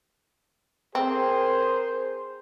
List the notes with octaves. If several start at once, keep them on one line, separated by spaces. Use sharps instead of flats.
C4 G#4 A#4 C5